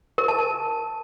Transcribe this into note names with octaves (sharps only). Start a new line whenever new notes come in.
A#4
A5
A5